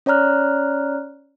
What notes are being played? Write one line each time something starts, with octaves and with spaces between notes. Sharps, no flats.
C#4 C#5 D5 A#5 F6 F#6